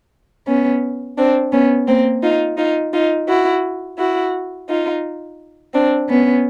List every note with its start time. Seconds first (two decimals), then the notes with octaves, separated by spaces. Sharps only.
0.47 B3 C#4
1.17 C4 D4
1.52 B3 C#4
1.88 A#3 C4
2.23 D#4 F4
2.58 D#4 F4
2.93 D#4 F4
3.28 E4 F#4
3.99 E4 F#4
4.69 D#4 F4
5.74 C4 D4
6.09 B3 C#4